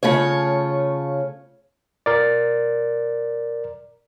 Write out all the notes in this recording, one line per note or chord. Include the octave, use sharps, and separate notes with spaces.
C#3 A3 F4 C#5
A#4 D5